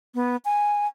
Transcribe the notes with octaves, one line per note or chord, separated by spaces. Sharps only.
B3
G#5